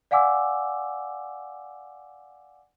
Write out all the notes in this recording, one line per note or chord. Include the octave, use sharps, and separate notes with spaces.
D5 F5 F#5 G#5 D6 E6